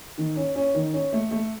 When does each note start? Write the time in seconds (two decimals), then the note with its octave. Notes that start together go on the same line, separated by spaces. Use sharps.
0.18 D#3
0.36 C#4
0.55 C#4
0.74 D#3
0.93 C#4
1.12 A3
1.31 A3